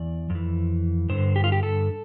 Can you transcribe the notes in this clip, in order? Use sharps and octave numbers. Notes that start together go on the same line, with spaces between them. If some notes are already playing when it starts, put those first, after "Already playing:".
Already playing: E2 E3 D5
F2
E3
G2 D3 C5
G4
F4
G4
A4